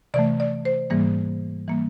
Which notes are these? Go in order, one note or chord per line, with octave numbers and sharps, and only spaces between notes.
C3 E3 A3 D5
D5
C5
G#2 E3 G3 A#3
E3 G3 A#3